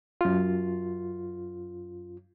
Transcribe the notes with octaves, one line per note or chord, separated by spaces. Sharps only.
F#2 F4